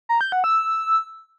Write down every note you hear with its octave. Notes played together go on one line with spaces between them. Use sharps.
A#5
G6
F#5
E6